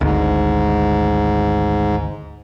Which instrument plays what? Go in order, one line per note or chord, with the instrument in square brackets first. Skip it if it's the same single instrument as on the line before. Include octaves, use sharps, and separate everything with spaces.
[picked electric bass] G#1 D2 [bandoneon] G#2